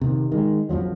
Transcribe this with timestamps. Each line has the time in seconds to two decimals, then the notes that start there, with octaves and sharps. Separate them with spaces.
0.01 C3 D#3
0.32 D#3 G#3
0.69 A#1 F2 F3 F#3